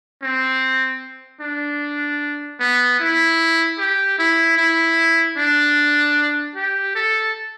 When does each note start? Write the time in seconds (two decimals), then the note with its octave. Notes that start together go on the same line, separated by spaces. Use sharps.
0.23 C4
1.41 D4
2.60 B3
3.00 E4
3.79 G4
4.18 E4
4.58 E4
5.37 D4
6.56 G4
6.95 A4